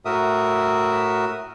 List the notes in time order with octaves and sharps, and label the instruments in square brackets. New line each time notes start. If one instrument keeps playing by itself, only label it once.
[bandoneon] A2 F#4 A#4 E5 D#6